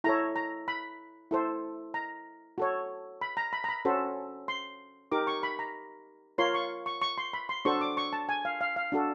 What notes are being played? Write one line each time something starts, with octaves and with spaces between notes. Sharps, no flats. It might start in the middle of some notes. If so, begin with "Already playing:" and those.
E4 A4 C#5 A#5
A#5
B5
E4 A4 C5
A#5
F#4 A4 C#5
B5
A#5
B5
A#5
B5
C#4 F#4 A4 C5
C6
D#4 G4 A#4 D6
C#6
B5
A#5
F4 A#4 C#5 C6
C#6
C#6
C#6
C6
B5
C6
D4 F#4 A4 C5 C#6
D6
C#6
A5
G#5
F5
F5
F5
D4 F#4 A4